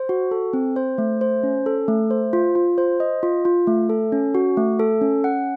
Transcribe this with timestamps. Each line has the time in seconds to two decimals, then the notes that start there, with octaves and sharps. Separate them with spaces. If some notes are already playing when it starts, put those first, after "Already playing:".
Already playing: C5
0.09 F#4
0.31 A4
0.53 C4
0.76 C5
0.98 A3
1.21 C5
1.43 C#4
1.66 A4
1.88 A3
2.10 C5
2.33 F4
2.55 F4
2.78 C5
3.00 D#5
3.23 F4
3.45 F4
3.67 A3
3.89 A4
4.12 C#4
4.35 F#4
4.57 A3
4.79 A4
5.01 C#4
5.24 F#5